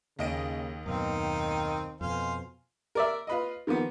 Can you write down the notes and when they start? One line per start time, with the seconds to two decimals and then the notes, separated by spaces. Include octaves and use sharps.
0.19 D#2 C#3 D#5 D7
0.86 F#2 B2 D#3 C4 D#4 F5
2.01 F2 B2 C5 F5 G#5
2.95 A#4 D5 E5
3.27 F4 B4 D#5
3.67 D#3 F3 A#3 B3